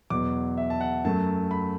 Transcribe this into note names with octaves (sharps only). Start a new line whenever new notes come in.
E2 B2 F#3 D6
E5
A5
F#5
F#2 F#3 A3 A5
B5